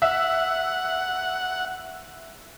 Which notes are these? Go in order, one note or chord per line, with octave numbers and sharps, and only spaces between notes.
E5 F#5